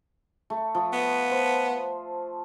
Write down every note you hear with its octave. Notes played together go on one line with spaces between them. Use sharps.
A3
F3
B3
C5